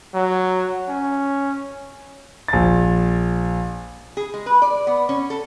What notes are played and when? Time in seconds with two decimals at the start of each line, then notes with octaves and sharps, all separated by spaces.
0.14 F#3
0.89 C#4
2.48 A#1 A6
4.17 G#4
4.34 G#3
4.46 B4
4.62 D5
4.87 B3
5.09 C#4
5.30 A4